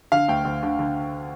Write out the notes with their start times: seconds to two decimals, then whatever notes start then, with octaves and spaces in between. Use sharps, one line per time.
0.12 D3 F5
0.28 D2 G5
0.45 D2
0.63 D3
0.79 D3